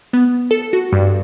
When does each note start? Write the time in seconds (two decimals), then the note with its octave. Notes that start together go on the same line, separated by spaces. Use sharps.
0.13 B3
0.51 A4
0.73 F#4
0.93 G2